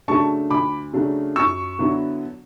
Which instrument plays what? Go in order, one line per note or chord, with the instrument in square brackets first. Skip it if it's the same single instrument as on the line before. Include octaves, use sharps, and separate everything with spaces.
[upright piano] C#3 F#3 A3 D4 A5 C#6
D2 B5 D6
C#3 F#3 A3 D4
F#2 C#6 E6
D3 F#3 B3 E4